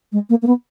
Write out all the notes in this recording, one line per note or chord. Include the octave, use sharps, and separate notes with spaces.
G#3
A#3
A#3
B3